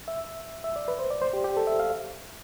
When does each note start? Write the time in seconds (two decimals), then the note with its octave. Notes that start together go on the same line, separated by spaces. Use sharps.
0.08 E5
0.64 E5
0.76 D5
0.88 B4
0.99 C5
1.11 D5
1.22 C5
1.33 G4
1.44 G4
1.57 A4
1.67 E5
1.80 F5